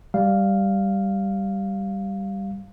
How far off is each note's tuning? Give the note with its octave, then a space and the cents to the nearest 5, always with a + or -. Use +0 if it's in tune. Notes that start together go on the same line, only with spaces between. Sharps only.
G3 +0 F5 +0